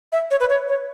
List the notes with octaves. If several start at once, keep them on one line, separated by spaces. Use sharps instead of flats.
E5
C#5
B4
C#5
C#5